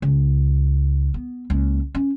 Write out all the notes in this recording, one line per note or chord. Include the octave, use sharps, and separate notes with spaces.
C#2
B3
C#2 A#3
C#4